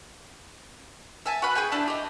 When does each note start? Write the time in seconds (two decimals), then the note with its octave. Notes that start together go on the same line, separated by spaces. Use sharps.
1.26 E5 G#5 A5
1.42 F#4 B4 B5 F#6
1.55 G#4 B4 G5 G#5
1.72 D4 E4 A5
1.88 G4 D#5